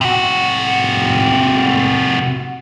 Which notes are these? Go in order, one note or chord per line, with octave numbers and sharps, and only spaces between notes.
C3 F#4